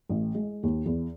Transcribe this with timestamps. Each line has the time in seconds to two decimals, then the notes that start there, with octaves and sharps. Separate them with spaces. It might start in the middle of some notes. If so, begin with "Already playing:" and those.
0.09 A1
0.35 G#3
0.63 D#2
0.86 E2